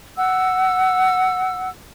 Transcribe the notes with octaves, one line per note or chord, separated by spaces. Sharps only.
F#5 E6